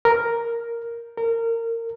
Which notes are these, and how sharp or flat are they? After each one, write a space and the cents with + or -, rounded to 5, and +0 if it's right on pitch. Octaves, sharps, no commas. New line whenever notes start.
A#4 +0
A#4 -25